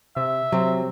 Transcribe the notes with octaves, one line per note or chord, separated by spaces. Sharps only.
C3 E5
C3 F#3 C4